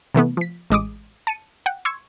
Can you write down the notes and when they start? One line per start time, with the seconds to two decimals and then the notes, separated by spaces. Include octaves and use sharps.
0.14 C3 E3 A3 B3
0.37 F3 B6
0.70 A1 G#3 D6 D#6
1.27 A5 C#7 D#7
1.66 F#5 G5
1.85 C6 C#6 E6 G#6